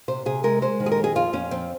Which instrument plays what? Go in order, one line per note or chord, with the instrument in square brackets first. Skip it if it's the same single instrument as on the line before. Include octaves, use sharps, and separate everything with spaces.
[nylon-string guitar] C3 C5
C3 G#4
G#3 A#4
G#3 C5
D#3
G#4
A#4
F2
G#4
F2 F4
F2 C#4
F3 C4